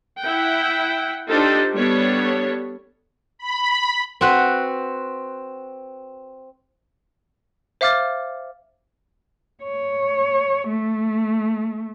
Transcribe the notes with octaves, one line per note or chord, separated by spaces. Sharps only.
E4 F#5 G5
D4 D#4 F4 G4 A4 C5
G3 B3 D4 A4 C#5
B5
C4 F#4 B4
C5 E5 F5 D6 F6 A6
C#5
A3